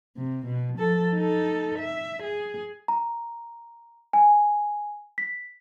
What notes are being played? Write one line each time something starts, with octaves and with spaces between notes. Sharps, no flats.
C3
B2
F3 A4
D#4 A4
E5
G#4
A#5
G#5
B6